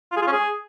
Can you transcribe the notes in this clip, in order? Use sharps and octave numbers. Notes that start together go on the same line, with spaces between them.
F4
G#4
F4
C#4
G#4